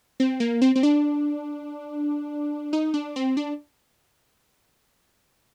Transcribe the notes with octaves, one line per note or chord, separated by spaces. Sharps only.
C4
A#3
C4
C4
D4
D#4
D4
C4
D4